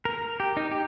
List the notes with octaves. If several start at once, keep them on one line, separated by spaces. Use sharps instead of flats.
A#4
G4
D#4
G4